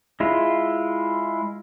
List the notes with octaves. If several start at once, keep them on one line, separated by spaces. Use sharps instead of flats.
G#3 E4 F4